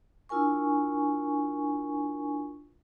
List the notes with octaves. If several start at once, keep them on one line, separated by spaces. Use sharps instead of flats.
D4 E4 F4 A#4 G#5 C#6